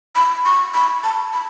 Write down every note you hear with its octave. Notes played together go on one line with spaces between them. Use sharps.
B5
C#6
B5
A5
B5